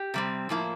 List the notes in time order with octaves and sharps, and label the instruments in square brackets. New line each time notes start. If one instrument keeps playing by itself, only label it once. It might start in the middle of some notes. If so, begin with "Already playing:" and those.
Already playing: [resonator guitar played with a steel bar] G4
C3 G3 C4
A2 F3 A#3 E4